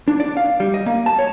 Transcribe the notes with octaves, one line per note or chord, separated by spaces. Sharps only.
D4
D5
F5
G3
D#5
A#3
A5
C#5